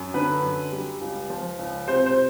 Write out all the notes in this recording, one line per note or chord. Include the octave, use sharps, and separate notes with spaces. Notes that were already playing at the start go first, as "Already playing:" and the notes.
Already playing: F#2
D3 B4
F#2
G3
C#2
F3
C#2
C3 C5
C5